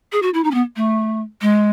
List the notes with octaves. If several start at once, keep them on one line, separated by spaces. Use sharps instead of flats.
G#4
F#4
E4
D#4
C#4
B3
A3
G#3